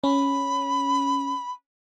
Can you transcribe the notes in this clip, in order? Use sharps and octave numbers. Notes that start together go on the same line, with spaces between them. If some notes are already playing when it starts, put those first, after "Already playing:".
C#4 B5